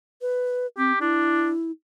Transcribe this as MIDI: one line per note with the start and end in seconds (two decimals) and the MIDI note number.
0.22 0.66 71
0.78 0.92 60
0.78 0.99 67
1.01 1.53 62
1.01 1.71 64